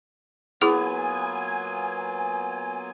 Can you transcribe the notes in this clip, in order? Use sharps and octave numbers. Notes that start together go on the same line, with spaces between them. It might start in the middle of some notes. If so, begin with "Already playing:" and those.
F#3 A#3 B3 E4 F4 G#4 G#5 D6